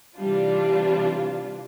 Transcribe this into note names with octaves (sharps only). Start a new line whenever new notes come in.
C3 E3 G3 D4 F4